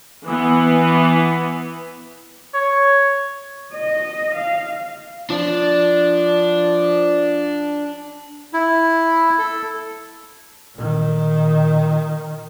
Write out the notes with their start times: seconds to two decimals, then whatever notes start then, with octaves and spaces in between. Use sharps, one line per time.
0.24 E3 B3
2.54 C#5
3.74 D#5
4.35 F5
5.30 F3 D4
8.53 E4
9.39 A4
10.75 A#2 D#3